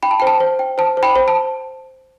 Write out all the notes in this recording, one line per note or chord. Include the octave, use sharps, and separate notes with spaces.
G5 B5
A5
C5 G5
A5
C5
G5
C5 A5
C5
G5 B5
C5
A5